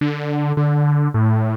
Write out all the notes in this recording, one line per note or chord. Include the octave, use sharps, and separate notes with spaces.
D3
D3
A2